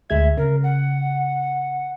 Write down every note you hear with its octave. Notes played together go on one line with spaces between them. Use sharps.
D2 G#3 E5 G#6
C#3 A#4
F#5